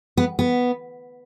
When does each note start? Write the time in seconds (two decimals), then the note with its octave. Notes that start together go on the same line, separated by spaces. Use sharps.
0.17 B3
0.39 B3